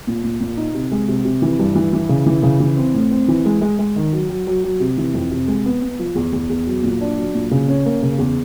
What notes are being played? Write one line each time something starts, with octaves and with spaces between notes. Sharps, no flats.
A#2
A#2
A#2
D#4
C3
G#3
C3
C3
E3
G2
E3
E3
C#3
E3
C#3
E3
C4
A2
C4
E3
G#3
G#3
G#3
D#3
F#3
F#3
F#3
F#3
C3
E3
F2
C3
G#3
B3
B3
F3
E2
E2
E2
F#3
A#2
D4
F#3
A#2
C#3
C#4
A#3
C#3
E2